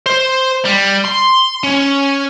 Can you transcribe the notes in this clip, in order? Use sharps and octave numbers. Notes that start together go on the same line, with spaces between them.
C5
G3
C6
C#4